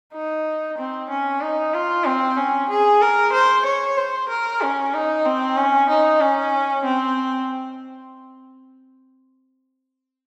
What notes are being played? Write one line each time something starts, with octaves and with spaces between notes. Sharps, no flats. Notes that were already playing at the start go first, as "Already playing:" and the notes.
D#4
C4
C#4
D#4
F4
C4
C#4
G#4
A#4
C5
C#5
C5
A#4
C#4
D#4
C4
C#4
D#4
C#4
C4